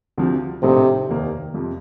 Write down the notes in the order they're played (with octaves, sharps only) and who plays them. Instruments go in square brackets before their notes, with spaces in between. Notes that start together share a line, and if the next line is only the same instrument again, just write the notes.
[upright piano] D2 C3 F3 C4
[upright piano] A#1 A2 A3 C4 D#4 [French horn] C3
[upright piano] F1 D#2 D#3 A#3 D#4
F2 C3 F3